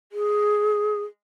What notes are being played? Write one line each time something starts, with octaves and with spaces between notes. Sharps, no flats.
G#4